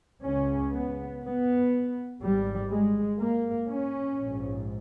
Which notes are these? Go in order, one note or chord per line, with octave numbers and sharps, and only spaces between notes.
C#2 C#3 C#4
B3
B3
G#1 G#2 G3
G#3
A#3
C#4
A#1 G#2